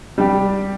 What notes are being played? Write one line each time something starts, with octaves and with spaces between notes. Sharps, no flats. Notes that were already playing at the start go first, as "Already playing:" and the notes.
G3 D4 G4